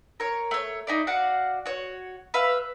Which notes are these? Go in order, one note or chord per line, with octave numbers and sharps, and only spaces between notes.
A#4 C#5
A3 C#5
D#4 E4 D5
F#4 D5 F5 F#5
F#4 C#5
B4 E5 F5